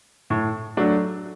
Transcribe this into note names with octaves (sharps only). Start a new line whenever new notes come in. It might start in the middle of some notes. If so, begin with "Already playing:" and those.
A2
F#3 A3 D4